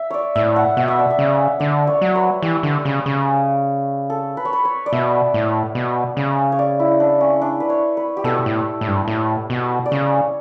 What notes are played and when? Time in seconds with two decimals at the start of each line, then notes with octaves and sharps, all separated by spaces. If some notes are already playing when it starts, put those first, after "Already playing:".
Already playing: E5
0.10 C#5 D5
0.35 A2 E5
0.56 F#5
0.77 B2 F#5
0.88 E5
0.99 D5
1.10 E5
1.19 C#3
1.60 D3 D5
1.87 C#5
2.01 F#3
2.15 B4
2.42 E3 G4
2.63 D3
2.85 C#3
3.06 C#3
4.10 A4
4.37 B4
4.45 C#5
4.53 B4
4.65 C#5
4.86 D5
4.93 B2 E5
5.34 A2
5.75 B2
6.17 C#3
6.52 C#5
6.59 D5
6.80 E4
7.00 D4
7.21 C#4
7.41 D4
7.60 B4
7.70 C#5
7.97 B4
8.17 G4
8.24 B2 A4
8.46 A2
8.81 A2
8.88 G2
9.08 A2
9.50 B2
9.86 D5
9.91 C#3 C#5